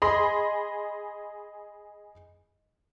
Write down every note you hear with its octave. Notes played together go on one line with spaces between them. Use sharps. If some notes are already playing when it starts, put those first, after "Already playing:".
G#4 D#5 B5 C6